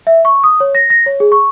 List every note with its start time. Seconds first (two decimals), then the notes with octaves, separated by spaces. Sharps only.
0.07 E5
0.25 C#6
0.44 D#6
0.60 C#5
0.75 A#6
0.90 A#6
1.06 C#5
1.20 G#4
1.32 C#6